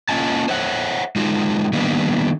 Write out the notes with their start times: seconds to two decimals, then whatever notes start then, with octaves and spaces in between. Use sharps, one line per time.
0.08 A#3 C#4 F4 D#5 G#5 A5
0.48 C5 C#5 E5 F#5
1.16 G#3 D#4 F4 F#4
1.73 D#3 G3 A#3 B3 D4